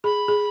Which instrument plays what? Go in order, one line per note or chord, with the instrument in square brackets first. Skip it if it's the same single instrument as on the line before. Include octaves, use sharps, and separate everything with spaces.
[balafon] G#4 [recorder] B5
[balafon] G#4